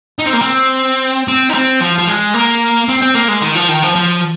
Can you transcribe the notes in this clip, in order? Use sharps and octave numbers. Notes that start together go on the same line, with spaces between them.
D#4
C4
A#3
C4
C4
D#4
C4
F3
F3
G#3
A#3
C4
C4
A#3
G#3
D#3
F3
D#3
F3
F3